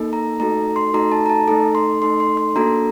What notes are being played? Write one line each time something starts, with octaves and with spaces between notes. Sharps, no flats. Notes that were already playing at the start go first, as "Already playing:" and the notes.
Already playing: A#3 D#4 A4
A#5
A3 D#4 F#4 A4 A#5
C6
A3 D#4 F#4 A4 A#5
A5
A#5
A5
A3 D#4 A4 A#5
C6
A3 D#4 A4 C6
C6
C6
A#3 D4 F#4 A4 A#5